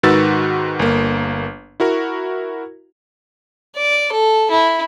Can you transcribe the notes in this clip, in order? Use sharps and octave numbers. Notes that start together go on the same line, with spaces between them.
G#2 D#3 F#4 B4 E6 A6
G1 A#3
E4 F#4 A#4
D5
A4
E4